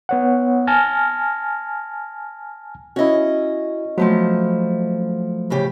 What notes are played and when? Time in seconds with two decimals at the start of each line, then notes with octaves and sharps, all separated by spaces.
0.09 B3 C#5 F#5
0.67 G#5 A5 F6 A#6
2.96 C#4 E4 F#4 D#5
3.98 F3 F#3 A3 B3 C5
5.50 A2 C#3 G4